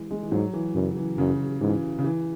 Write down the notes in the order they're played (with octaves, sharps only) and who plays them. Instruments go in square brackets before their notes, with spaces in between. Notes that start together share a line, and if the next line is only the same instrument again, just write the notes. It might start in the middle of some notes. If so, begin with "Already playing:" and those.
Already playing: [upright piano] E3 G#3
G#3
E3
[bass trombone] G#2 [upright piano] F#3
[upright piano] E3
[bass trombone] F#2 [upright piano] C#3
[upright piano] E3
[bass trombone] F#2 [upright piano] C#3
[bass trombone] G#2 [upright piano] E3
[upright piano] C#3
E3